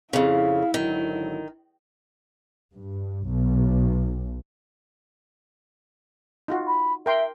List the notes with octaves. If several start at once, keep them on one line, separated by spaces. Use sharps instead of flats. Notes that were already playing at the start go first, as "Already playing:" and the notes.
F2 C#3 E4 F5
G#1 D3 D#3 F#3
G2
B1
D#4 F4 F#4
B5
A#4 E5 G5 C6